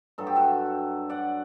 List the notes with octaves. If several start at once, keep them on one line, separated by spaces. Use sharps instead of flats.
G2 F#3 A4
G4
F#4 A4
D5 F#5